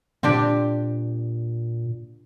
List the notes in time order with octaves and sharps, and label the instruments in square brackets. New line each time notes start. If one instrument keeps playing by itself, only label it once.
[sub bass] A#2 [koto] C4 D4 G4